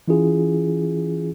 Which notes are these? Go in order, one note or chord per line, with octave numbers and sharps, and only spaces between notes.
E3 C#4 E4 F4 G#4